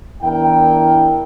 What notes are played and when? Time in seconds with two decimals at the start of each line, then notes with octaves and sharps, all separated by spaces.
0.23 E2 D4 E4 A#4 G5